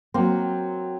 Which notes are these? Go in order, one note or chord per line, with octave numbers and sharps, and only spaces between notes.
F#3 A#3 C4